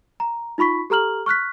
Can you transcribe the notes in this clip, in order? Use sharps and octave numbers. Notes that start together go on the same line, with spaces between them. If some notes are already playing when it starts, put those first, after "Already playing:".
A#5
D#4 F4 B5 C#6 B6
G4 A4 A#5 F6 F#7
C#6 F6 F#6 B6